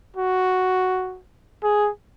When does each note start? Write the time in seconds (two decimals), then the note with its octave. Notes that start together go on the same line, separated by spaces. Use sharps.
0.17 F#4
1.63 G#4